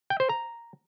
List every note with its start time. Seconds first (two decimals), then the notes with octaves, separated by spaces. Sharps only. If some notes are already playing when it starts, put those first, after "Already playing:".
0.10 G5
0.20 C5
0.29 A#5